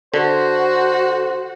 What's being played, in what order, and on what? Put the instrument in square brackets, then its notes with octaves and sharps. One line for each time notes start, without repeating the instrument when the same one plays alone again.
[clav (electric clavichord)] D3 [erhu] F#4 [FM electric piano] A4 [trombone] C5